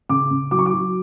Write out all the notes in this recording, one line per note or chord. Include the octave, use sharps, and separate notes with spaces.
C#3 D6
C#3
F#3 D6
C#6
D6
F#3